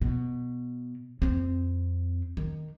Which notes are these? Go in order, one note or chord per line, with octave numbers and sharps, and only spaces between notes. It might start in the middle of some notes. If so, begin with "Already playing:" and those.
B2
F2 C4
D#3